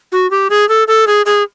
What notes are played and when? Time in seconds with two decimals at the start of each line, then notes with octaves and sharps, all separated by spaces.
0.12 F#4
0.31 G4
0.50 G#4
0.69 A4
0.88 A4
1.07 G#4
1.26 G#4